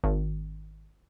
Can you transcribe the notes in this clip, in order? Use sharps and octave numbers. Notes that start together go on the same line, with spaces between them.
G#1